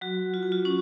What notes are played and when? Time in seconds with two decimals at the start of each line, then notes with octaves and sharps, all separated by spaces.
0.01 F#3 F#4
0.34 F4
0.43 F#4
0.52 F4
0.65 C#4